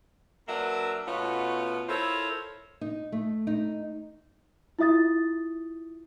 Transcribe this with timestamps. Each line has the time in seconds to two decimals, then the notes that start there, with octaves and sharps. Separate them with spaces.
0.48 F#3 A#3 D4 A#4 B4 E5
1.07 B2 A3 B3 C#4 F4
1.88 E4 F4 A4 A#4 C5 C#5
2.81 D#4
3.12 A3
3.47 D#4
4.79 E4 F4 E5 D#6 A6